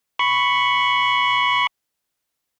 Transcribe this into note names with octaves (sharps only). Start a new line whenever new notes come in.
B5 C#6